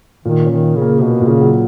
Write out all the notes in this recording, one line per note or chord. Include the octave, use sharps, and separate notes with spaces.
A#2 D#3
C#4
D#3
A#3
C#3
A#3
B2 A#3
A#2
C#3
F#3